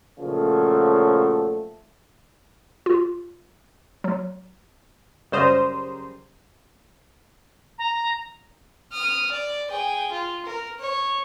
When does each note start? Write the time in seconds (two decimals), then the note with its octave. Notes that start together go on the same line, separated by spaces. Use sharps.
0.19 A#2 C#3 F3 F#3 A3
2.86 F4
4.04 F#3
5.32 F#2 C#3 G3 C5 A#5 D#6
7.78 A#5
8.92 D#6 F6
9.31 D5
9.69 G#4 G5
10.11 F4
10.45 A#4
10.80 C#5